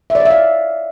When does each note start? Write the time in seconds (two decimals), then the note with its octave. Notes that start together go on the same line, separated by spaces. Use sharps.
0.10 E5
0.15 D5
0.20 C#5
0.25 E5
0.30 F5